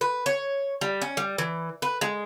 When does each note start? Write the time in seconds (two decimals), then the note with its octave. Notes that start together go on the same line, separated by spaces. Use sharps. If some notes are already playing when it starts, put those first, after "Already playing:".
0.01 B4
0.26 C#5
0.81 G3
1.02 C#4
1.17 G3
1.38 E3
1.82 B4
2.01 G#3